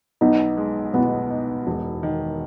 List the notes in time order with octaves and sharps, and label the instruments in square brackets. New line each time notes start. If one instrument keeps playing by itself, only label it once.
[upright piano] B1 [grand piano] B3 D#4
[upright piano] G#3
[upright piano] B2 [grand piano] B3
[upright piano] D#4
E1
D#3